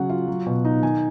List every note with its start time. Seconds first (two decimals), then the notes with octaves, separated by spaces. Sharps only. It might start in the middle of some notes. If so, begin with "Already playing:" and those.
Already playing: C#3 F#3 F#5
0.09 F4
0.28 F#3
0.46 B2
0.65 D#4
0.83 D#3 G#5